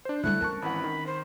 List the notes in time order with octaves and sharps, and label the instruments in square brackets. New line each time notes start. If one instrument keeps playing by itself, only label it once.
[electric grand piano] D4 C5
[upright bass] D3 G3 [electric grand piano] A3 E4 [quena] F#6
[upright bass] C4 C#4 [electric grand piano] A#4 A5 C#6
[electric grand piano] G#1 E3 F#5 [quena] B5
[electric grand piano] D#3
[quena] C5